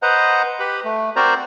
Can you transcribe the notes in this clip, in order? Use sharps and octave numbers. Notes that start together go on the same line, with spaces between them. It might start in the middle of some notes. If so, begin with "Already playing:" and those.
B4 C5 D#5 F#5 A#5
G4 B4 B5
A3
C4 F#4 A#4 C5 D5 A#5